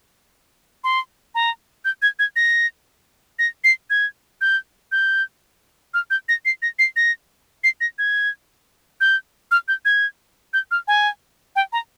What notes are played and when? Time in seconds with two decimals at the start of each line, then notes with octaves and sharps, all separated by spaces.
0.84 C6
1.35 A#5
1.85 G6
2.02 G#6
2.19 G#6
2.36 A#6
3.39 A#6
3.64 C7
3.90 G#6
4.41 G6
4.92 G6
5.94 F6
6.10 G6
6.29 A#6
6.45 C7
6.62 A#6
6.79 C7
6.96 A#6
7.64 C7
7.81 A#6
7.99 G#6
9.01 G6
9.51 F6
9.68 G6
9.85 G#6
10.53 G6
10.71 F6
10.88 G#5
11.56 G5
11.73 A#5